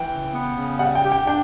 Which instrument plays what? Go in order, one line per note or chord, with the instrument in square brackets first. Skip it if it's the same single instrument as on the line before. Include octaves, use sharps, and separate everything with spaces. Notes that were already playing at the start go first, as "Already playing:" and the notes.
Already playing: [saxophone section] E3 [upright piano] G5
[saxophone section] C#3
B3
C#3
[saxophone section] G3 [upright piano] F#5
[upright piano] G5
[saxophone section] G4
[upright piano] G5
[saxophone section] D4 [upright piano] G5